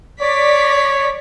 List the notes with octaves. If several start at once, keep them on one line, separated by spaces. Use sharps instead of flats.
C#5 D5 B6